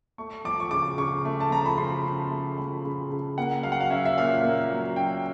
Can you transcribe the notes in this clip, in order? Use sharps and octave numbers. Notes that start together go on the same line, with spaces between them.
A3 C#6
F3 D6
C#6
C#3 D6
C#3 C#6
A3
A5
F3 A#5
B5
C#3 C6
C#3
A3
C6
F3 B5
C#3
C#3
A#3 F#5
F#3 F5
F#5
F5
C#4 E5
E5
A#2 F5
A#3
F#3
C#4 G5